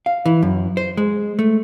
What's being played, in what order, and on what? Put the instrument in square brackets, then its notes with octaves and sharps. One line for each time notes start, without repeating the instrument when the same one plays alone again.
[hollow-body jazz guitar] F5
E3
F#2
C5
G#3
A3